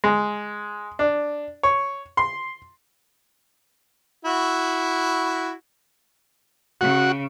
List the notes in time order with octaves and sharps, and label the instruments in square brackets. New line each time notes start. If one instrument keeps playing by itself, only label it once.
[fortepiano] G#3
D4
C#5
C6
[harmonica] E4 F#4
[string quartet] C#3 [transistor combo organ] F#4